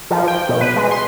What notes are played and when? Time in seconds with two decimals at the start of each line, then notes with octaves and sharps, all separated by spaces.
0.11 F3
0.28 G5
0.49 B2
0.61 B4
0.76 G#3
0.91 C6